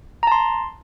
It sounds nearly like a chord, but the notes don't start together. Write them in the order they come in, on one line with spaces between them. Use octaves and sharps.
A#5 A5 C6